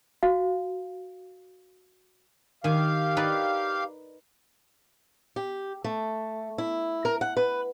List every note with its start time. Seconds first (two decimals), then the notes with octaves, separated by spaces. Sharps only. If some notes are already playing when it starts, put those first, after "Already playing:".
0.23 F#4 F5
2.64 D#3 G4 F5 G#5
3.17 D#4 B4 D5
5.36 G4
5.84 A3
6.58 E4
7.05 A#4
7.21 F#5
7.37 B4